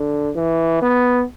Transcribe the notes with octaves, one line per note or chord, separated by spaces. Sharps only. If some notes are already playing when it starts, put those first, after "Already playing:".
Already playing: D3
E3
B3